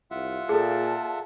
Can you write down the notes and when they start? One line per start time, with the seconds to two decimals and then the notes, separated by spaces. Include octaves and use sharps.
0.11 C2 F4 E5 F#5
0.49 A#2 G#4 A4 A5